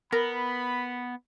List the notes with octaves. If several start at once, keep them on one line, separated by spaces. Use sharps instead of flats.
B3 A#4 B5